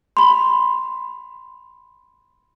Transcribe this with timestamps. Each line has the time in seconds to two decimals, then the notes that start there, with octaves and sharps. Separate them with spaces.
0.17 B5 C6